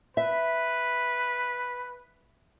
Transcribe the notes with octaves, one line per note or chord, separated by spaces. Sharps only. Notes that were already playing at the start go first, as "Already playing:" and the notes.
B4 E5